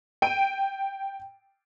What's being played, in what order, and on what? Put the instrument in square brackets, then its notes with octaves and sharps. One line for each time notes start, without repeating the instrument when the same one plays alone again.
[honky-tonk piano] G5 D7 D#7